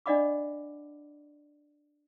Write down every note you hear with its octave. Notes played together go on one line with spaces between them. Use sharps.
D4 D5 D#5 F#5 B5 D6